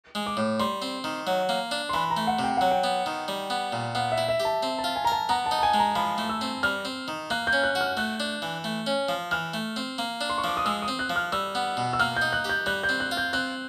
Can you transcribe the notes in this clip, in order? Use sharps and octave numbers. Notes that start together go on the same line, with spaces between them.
G#3
D6
A2
G3 C6
C4
D#3
F#3
A#3
D4
C6
E3 B5
A#5
A3
F#5
C3
G5
F#3 F#5
G5
B3
D#3
G3
B3
A#2
B3 F5
E5
E4
E5
G4
A5
C4
A5
F4
G#5
A#5
A#4 A5
B3 A#5
A5
D#4
A5
G#5
G#3
A#5
F3 B5
A3
E6
C4
G3 F6
C4
D#3
A#3 F#6
G6
C#4
F#6
F#4
F6
A3 F#6
D4
E3
A3
C#4
F3
E3 F6
A3
C4
A#3
D4
C6
C#6
F3 D6
D#6
G#3 E6
D#6
C4
F#6
F3
F6
G3 E6
B3
B2
E6
A#3 F6
G6
D#4
F#6
G4 G6
G3 F#6
G6
C4
F#6
F4
G6
C4 F#6